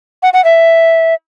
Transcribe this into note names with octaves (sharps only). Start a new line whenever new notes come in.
F#5
F#5
E5